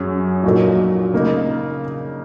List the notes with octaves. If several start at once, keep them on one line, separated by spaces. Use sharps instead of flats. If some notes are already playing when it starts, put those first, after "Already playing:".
Already playing: F#2 F#3 C#4 G#4
A#1 A#2 F#3 D#4 A#4
C#3 A#3 D#4